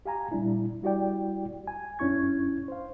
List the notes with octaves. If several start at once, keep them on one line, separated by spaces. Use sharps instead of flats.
G4 F5 G#5 A#5
A#2 G3 D4 E4
G3 E4 F#4 G4 D5 G5
G#5
F#2 C#4 D4 E4 C#6 G#6
C5 F5